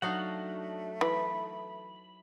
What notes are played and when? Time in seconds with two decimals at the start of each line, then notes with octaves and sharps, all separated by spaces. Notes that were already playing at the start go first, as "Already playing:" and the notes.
0.02 F#3 A3 D4 D#4 F#4 F5 F#5
1.01 E3 B5